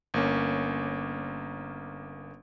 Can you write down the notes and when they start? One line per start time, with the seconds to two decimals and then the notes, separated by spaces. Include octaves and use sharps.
0.14 G1 A#3 C#4